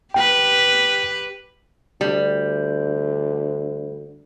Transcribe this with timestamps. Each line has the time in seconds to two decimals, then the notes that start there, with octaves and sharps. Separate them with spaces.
0.14 G4 B4 G5
2.01 D2 G3